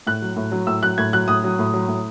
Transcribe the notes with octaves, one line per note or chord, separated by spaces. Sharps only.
A2 F#6
F#3
A2
F#3
A2 E6
F#3 F#6
A2 G#6
F#3 F#6
A2 D#6
F#3
A2
F#3
A2